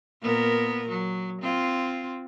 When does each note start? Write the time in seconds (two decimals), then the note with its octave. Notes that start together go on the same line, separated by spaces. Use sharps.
0.21 A#2 B3 A#4
0.89 F#3
1.41 C4 F4